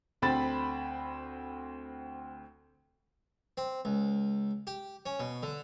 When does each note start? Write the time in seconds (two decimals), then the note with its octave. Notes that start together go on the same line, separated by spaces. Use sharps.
0.22 D2 C4 B5 A6
3.57 C4
3.85 C#2
4.67 G4
5.06 C#4
5.20 B2
5.43 D3